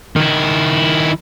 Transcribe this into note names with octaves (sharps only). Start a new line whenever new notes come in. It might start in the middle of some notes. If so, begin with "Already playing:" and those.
D#3 E4